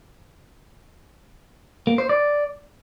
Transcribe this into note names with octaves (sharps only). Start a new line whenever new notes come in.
A#3
C5
D5